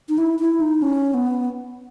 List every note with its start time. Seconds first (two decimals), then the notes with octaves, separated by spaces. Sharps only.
0.09 D#4
0.18 E4
0.39 E4
0.60 D#4
0.82 C#4
1.14 B3